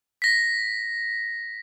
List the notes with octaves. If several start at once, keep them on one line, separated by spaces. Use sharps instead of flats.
A#6 B6